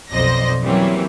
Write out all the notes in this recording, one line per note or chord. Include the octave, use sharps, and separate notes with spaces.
B1 F2 C5 D5 D#5 A#6
E3 F#3 G3 A#3 C4 C#4